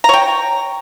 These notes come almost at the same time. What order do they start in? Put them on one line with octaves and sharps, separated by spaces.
A#5 C#5 G5